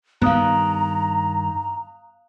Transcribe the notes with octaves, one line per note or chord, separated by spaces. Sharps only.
G2 D#3 B3 F5 A#5 D#6 F#6